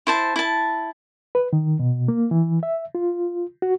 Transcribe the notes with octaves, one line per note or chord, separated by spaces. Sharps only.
E4 C5 A5
E4 A5
B4
D#3
B2
A#3
E3
E5
F4
F#4